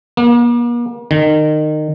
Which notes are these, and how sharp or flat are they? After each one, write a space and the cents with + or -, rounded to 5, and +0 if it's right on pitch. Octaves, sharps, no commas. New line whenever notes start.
A#3 +45
D#3 -25